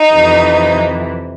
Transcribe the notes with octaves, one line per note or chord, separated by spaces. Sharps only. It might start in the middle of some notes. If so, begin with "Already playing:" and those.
Already playing: D#4
F2 C3 E3